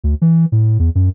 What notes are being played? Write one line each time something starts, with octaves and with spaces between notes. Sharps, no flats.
D2
E3
A2
E2
F#2